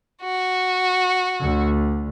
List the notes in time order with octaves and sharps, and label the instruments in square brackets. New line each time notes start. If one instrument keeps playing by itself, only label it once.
[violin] F#4
[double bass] D2 D3